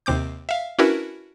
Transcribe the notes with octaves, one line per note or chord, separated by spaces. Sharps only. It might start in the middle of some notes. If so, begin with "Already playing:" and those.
D#2 C3 C4 D6 G6
E5 F5
C#4 D4 E4 F#4 A#4 B4